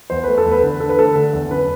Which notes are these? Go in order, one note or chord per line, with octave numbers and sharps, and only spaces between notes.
E2 C5
A3 B4
A4
E2
B4
D3
D3 A4
B4
A3 A4
D3
E2
F#2 B4